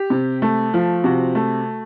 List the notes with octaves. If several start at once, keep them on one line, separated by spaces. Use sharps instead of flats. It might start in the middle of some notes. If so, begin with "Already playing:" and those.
Already playing: G4
C3
A3
F3
C3 F#4
A3